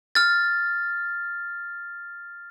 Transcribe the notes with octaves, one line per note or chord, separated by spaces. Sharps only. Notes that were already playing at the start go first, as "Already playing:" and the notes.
F6 A6